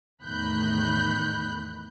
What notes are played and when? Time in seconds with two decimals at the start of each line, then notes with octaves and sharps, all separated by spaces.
0.22 E2 A2 D#3 B5 F#6 G6